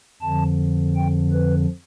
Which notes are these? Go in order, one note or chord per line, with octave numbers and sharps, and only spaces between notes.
F2 D3 F3 A5
G5
B4